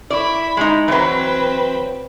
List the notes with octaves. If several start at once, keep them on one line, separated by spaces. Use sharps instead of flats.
E4 D5 B5
G#3 D#4
E3 F#3 C4 B4